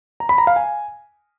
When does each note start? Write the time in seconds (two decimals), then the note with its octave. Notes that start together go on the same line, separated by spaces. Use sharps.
0.20 A#5
0.29 B5
0.38 A#5
0.47 F5
0.56 G#5